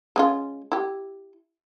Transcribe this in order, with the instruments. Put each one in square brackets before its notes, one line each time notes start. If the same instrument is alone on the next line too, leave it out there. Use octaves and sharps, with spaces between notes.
[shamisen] G#3 C#4 F4
E4 G4